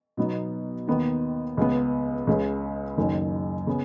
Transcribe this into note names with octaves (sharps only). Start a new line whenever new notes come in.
B2 F#3 B3 D#4
D#2 D#3 B3 D#4
C#2 C#3 B3
C#2 C#3 G#3 C#4
F#1 F#2 D#3
C#3 B3